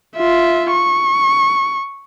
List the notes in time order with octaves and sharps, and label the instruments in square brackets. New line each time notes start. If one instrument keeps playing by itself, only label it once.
[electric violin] F4 E5
C#6